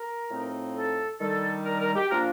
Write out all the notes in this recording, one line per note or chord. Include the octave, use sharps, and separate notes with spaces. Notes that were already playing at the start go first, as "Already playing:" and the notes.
Already playing: A#4
A2 F3 C4 D#4
A4
D#3 G3 D4 A4
A#4
A#4
G4
A#2 F3 A#3 D4 F4 A#4